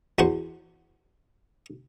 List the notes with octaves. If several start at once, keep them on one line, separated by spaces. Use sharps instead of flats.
E2 F#4 C5